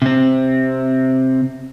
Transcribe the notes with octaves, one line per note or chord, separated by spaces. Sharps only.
C3 C4